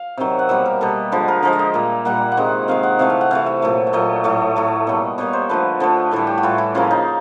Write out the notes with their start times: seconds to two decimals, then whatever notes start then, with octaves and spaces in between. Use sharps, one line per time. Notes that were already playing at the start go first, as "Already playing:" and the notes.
Already playing: F5
0.18 C3 D#3 F#3
0.39 F#5
0.49 B2 G3 A#3 E5
0.66 A#4
0.81 B2 G3 A#3 A4
1.12 D3 F3 G#3 B4
1.28 A#4
1.43 D3 F3 G#3 A#4
1.53 D#5
1.59 E5
1.74 A#2 G3 A#3
2.05 A#2 G3 A#3 F#5
2.32 F#5
2.37 C3 D#3 G#3
2.68 C3 D#3 G#3 F5
2.83 F#5
2.99 C3 E3 A3 F5
3.10 F5
3.21 F#5
3.31 C3 E3 A3 F5
3.46 E5
3.62 A#2 F#3 A3
3.87 E5
3.93 A#2 F#3 A3 D#5
4.24 A2 F#3 A3
4.56 A2 F#3 A3
4.87 B2 G3 A#3
5.18 B2 G3 A#3 C#5
5.33 C5
5.49 D3 F3 A3 B4
5.80 D3 F3 A3
6.11 A2 E3 G3 A4
6.27 G4
6.38 F#4
6.43 A2 E3 G3 F4
6.58 E4
6.75 C#3 F3 A#3 F4
6.91 D#4